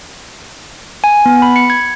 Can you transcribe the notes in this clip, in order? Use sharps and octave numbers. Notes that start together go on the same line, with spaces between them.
G#5
B3
B5
C#7
G#6